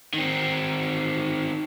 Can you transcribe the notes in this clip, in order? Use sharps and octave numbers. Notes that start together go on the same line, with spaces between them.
D#3 C4